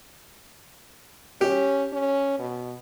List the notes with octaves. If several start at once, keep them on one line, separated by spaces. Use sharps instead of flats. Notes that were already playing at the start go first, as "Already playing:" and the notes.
C#4 G4
C#4
B2